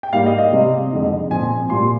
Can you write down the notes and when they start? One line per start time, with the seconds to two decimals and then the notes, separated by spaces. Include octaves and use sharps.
0.03 G5
0.13 G#2 G3 A#3 F5
0.26 D#5
0.38 D#5
0.52 C3 G3 C4
0.91 F2 D3 G#3 D#4
1.31 A#2 F3 C4 G#5
1.70 A#2 G3 A#3 F4 C6